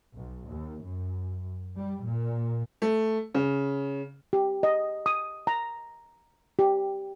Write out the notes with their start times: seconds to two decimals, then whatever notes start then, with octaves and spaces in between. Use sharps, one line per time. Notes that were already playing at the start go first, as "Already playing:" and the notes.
0.16 B1
0.50 D#2
0.83 F#2
1.78 G3
2.09 A#2
2.82 A3
3.35 C#3
4.33 G4
4.63 D#5
5.06 D#6
5.47 A#5
6.59 G4